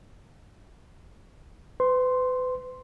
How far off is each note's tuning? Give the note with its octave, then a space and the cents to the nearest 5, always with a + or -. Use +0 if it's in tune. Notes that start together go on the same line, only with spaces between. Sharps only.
B4 +40 C6 +0